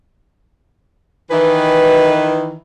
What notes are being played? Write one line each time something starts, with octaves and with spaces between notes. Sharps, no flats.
D#3 E3 B4